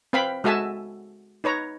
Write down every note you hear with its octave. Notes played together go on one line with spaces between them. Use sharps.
C4 B4 F5 G5 B5
G#3 F#4 A4 E5 G#5 A5
D#4 B4 C#5 A#5